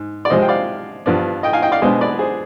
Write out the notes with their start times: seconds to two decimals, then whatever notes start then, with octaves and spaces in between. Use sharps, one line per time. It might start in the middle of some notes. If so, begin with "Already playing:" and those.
Already playing: G#2
0.25 D5
0.30 C3 F3 G#3 C4 C5 D#5
0.42 G5
0.49 D5 F5
1.06 G2 F3 B3 D4
1.43 D#5 G5
1.53 F5 G#5
1.62 D#5 G5
1.72 D5 F5
1.82 B2 G#3 B3 D4 C5 D#5
2.01 B4 D5
2.19 G#4 C5